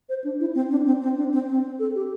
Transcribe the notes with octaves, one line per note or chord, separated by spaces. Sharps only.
C5
D4
E4
C4
D4
C4
C4
D4
C4
C4
A4
G4